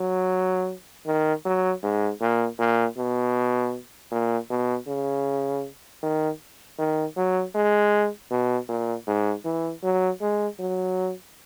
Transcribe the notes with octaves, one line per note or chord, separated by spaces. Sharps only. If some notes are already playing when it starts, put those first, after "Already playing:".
Already playing: F#3
D#3
F#3
G#2
A#2
A#2
B2
A#2
B2
C#3
D#3
D#3
F#3
G#3
B2
A#2
G#2
E3
F#3
G#3
F#3